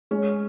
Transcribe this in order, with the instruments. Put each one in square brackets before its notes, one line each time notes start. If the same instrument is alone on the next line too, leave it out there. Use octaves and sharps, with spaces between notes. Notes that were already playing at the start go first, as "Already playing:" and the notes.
[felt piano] G#3 [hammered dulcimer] C#4